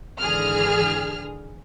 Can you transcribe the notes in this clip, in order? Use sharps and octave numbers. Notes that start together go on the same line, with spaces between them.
G#1 D3 E3 G#4 F6